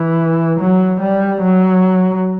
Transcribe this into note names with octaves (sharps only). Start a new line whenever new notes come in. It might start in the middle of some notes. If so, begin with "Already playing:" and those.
Already playing: E3
F#3
G3
F#3